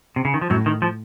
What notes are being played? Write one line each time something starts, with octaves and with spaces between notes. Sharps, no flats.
C3
C#3
D#3
F3
F#2 A2 F#3
D#3
F3